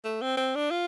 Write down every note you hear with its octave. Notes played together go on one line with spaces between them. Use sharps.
A3
C4
C4
D4
F4